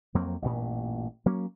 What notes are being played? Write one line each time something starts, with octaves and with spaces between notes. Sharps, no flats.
F2 F#3 A#3 C4
A1 G2 A#2
F#3 A#3 C#4